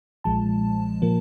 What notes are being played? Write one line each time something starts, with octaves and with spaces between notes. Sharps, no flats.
B1 A#2 F3 G#3 A5
A#2 F3 A#3